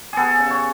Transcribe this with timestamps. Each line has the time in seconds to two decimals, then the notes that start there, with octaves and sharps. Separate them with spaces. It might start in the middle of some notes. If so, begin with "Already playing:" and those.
0.13 B3 G#4 A4
0.40 C#3
0.50 C#5